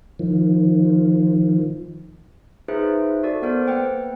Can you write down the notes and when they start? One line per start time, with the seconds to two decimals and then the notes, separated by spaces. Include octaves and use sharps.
0.19 D#3 F3
2.68 D#4 F4 G#4 B4 C5 E5
3.23 F#4 A4 D5
3.42 B3 A#4 C5 D5
3.68 A#3 B4 F#5 G5